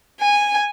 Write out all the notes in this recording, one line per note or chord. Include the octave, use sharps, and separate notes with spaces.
G#5